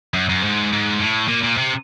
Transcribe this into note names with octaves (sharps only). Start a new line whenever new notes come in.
F#2
F#2
G#2
G#2
A2
A#2
A#2
C3